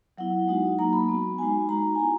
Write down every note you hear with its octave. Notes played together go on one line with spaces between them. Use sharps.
F#3 B3 E4 F#5
G#3 D#4 F#4
F#3 A#3 D#4 A#5
B5
B3 F#4
G#3 D#4 F#4 G#5
G#3 D#4 F#4 A#5
G#5
B3 E4 A#5